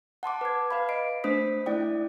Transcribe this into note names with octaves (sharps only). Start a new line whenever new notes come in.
F#5 A5 C6 D6
B4 G#6
B4 F5 B5
D#5 B5 C7 D7
A3 D4 C5 D#6 B6
A3 E4 D5 G5 D#6